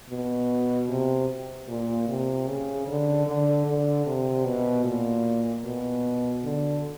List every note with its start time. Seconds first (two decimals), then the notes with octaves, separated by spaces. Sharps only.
0.10 B2
0.89 C3
1.69 A#2
2.09 C3
2.47 C#3
2.88 D3
3.27 D3
3.67 D3
4.06 C3
4.45 B2
4.85 A#2
5.65 B2
6.44 D3